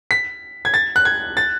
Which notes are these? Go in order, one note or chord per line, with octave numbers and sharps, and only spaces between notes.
B6
G#6
A6
F#6
G#6
A6